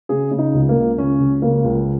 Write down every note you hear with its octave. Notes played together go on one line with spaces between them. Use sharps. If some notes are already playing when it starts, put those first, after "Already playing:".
C#3 G#4
C#3
D#4
C#2
A#3
C#2
C#2 C#4
C#2
C#3 A#3
C#2